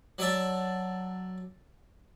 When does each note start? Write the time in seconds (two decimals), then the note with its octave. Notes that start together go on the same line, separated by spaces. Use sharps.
0.18 F#3 D5 E5 A5